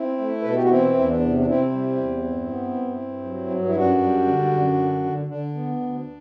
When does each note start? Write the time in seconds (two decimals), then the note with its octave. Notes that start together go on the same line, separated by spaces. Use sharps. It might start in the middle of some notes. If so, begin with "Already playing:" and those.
Already playing: C4 E4
0.18 A3
0.41 B4
0.44 B2 A4
0.55 G4
0.62 F#4
0.69 E3 C4 E4
0.95 E2 E4
1.08 D4
1.20 C3
1.37 D4
1.46 C3 C4 E4
1.72 G3
1.97 E2
2.22 G2
2.48 B3
2.74 G2
2.99 G2
3.24 F#3
3.50 G2
3.66 E4
3.75 F#2 D4 F#4
4.01 G3
4.27 D3
4.52 F#2
4.77 D3
5.03 D3
5.28 D3 D4
5.54 B3
5.80 D2